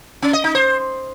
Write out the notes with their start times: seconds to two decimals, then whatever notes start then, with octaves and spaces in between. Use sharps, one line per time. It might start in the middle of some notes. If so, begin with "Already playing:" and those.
0.22 C#4
0.33 D#5
0.44 D#4
0.55 C5